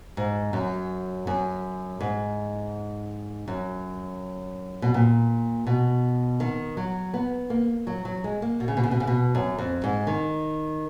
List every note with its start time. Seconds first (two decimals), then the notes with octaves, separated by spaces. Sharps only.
0.17 G#2
0.53 F#2
1.27 F#2
2.01 G#2
3.48 F#2
4.82 B2
4.94 A#2
5.67 B2
6.40 D#3
6.77 F#3
7.14 B3
7.50 A#3
7.87 F#3
8.05 F#3
8.24 G#3
8.42 A#3
8.60 B2
8.68 C#3
8.77 B2
8.84 C#3
8.91 B2
9.00 C#3
9.07 B2
9.35 F#2
9.58 F2
9.84 G#2
10.07 D#3